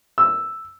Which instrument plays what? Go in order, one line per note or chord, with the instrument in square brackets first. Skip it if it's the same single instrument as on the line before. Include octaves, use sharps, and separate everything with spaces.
[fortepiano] E6